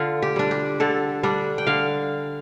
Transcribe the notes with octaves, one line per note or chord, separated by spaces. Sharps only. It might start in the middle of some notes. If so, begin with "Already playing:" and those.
Already playing: D3 F4
G4
G3 D4
G4
D3 A4
G3 D4
G5
D3 F5